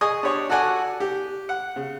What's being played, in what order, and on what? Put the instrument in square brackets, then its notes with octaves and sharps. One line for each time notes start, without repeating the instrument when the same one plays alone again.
[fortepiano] G#4 D#5 G#5 C#6 D#6
D4 G4 C#5
F#4 A4 D5 F#5 G#5 D6
G4
F#5
C#3